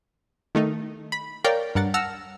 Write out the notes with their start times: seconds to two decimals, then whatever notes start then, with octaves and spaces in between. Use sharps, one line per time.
0.55 D#3 A3 D#4
1.12 B5
1.44 A#4 C#5 D5 F5 G5
1.75 G2 A#4 F#5 A6
1.94 F#5 A5 E6 F6 A#6 C#7